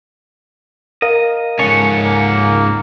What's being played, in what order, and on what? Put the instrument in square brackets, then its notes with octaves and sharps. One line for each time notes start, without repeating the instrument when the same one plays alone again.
[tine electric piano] A#4 F5 [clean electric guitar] D#5
[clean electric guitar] C#2 A4 C#5 [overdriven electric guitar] G#2 C#4
[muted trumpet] A#3